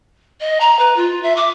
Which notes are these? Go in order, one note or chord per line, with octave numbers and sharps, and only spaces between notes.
D#5
A#5
B4
F4
E5
D6